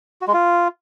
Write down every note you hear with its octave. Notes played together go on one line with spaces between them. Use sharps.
F#4
G#3
F4